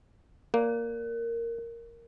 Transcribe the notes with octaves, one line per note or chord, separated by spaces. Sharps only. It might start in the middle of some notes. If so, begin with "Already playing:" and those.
A#3 A#4